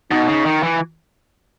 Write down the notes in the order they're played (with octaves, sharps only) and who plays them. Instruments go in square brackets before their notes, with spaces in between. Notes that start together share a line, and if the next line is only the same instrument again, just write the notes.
[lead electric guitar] B2 [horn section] D#4
[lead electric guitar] C#3
D#3
E3